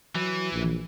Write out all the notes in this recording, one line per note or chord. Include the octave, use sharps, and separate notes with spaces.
E3 F#3
A#1